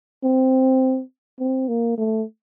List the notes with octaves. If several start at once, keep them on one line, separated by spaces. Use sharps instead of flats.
C4
C4
A#3
A3